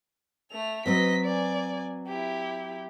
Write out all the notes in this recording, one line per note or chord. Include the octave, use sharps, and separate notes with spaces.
A3 F7
F#3 C4 B4 D#5 B6
D5 G#5
E4 G4